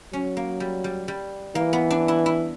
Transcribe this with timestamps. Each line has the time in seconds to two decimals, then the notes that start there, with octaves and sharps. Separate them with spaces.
0.13 F#3 C#4
0.37 A#3
0.60 G3
0.84 G3
1.08 G3
1.55 E3 A#3
1.73 B3
1.91 D4
2.08 E4
2.26 E4